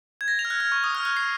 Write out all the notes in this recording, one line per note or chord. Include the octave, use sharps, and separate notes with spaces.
G#6
A#6
F7
F6
F#6
F6
C#6
D#6
F6
F#6
C7